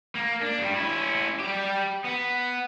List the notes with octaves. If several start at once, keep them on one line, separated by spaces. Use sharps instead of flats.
A#3
D4
G2 G3
C#4 E4
G3 G4
B3